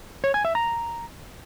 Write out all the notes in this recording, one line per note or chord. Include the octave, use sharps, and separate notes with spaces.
C#5
G#5
E5
A#5